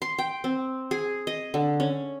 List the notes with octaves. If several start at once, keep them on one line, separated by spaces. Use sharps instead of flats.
C6
G5
C4
G#4
D#5
D3
C#4